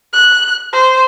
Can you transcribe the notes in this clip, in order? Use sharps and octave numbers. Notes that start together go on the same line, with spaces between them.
F#6
C5